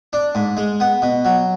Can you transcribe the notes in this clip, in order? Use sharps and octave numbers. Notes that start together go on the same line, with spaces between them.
D4
G#2
G#3
B3
B2
F#3